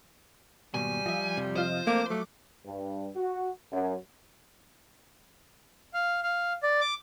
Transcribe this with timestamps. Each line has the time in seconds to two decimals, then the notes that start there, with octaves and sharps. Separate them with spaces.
0.74 D#2 G#2 B2 G3 G#5
1.06 F3 D#5 E5
1.37 F2 C3
1.56 F4 C5 D#5
1.87 A3 A#3 C4 A#4 D6
2.10 F#3 A3
2.63 G2
3.14 F#4
3.70 F#2
5.94 F5
6.23 F5
6.63 D5
6.81 D6